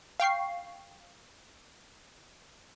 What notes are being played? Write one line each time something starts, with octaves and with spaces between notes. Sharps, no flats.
F5 G5 C#6 C7